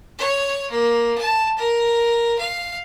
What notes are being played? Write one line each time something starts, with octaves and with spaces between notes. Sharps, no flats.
C#5
A#3
A5
A#4
F5